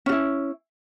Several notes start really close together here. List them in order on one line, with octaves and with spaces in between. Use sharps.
C#4 F#4 E4